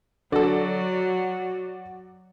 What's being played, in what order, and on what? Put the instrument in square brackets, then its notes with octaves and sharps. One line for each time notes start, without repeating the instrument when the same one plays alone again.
[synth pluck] D3 A4 [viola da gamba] F#3 [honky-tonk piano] F#4 D5